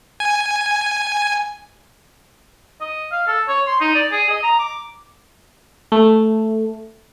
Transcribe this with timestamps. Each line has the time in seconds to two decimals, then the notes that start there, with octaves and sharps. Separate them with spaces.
0.20 G#5
2.81 D#5
3.12 F5
3.27 A4
3.48 C#5
3.67 C6
3.81 D#4
3.95 D5
4.11 G#4
4.30 D#5
4.43 A#5
4.59 D6
5.92 A3